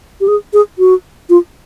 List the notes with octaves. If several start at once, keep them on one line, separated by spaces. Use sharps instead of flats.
G4
G#4
G#4
F#4
F4